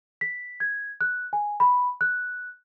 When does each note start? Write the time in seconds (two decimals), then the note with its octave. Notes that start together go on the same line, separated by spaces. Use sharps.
0.21 B6
0.60 G#6
1.01 F#6
1.33 G#5
1.60 B5
2.01 F#6